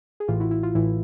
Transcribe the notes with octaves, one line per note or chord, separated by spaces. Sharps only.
G#4
A1 A2 E3 F4 G4
E4 F#4
E4
F4
A1 A2 E3 E4